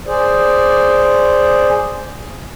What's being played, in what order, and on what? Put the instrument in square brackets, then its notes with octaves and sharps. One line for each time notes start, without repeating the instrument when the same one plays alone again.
[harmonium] G#4 C5 D5